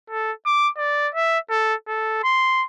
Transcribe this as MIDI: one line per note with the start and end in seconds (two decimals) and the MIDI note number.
0.10 0.32 69
0.45 0.69 86
0.78 1.09 74
1.15 1.38 76
1.50 1.74 69
1.88 2.22 69
2.23 2.64 84